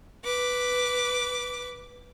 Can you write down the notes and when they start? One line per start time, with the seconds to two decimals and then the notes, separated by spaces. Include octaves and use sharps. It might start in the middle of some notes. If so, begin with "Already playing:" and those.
0.25 B4 D6